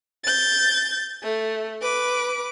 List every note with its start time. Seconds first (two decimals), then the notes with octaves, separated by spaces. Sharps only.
0.24 G6 A6
1.23 A3
1.81 B4 D6